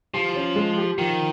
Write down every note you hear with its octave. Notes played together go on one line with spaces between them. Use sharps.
F3 G4
C#4
G#3
G4
D#3 F3